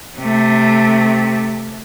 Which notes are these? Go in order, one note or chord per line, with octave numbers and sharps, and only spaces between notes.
C3 A3